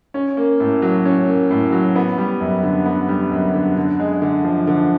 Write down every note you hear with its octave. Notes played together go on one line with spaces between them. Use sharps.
C#4
A#3
A2
F#3
C#4
A#3
A2
F#3
B3
G3
F#2
D3
B3
G3
F#2
D3
D3
G#3
D3
F3
D3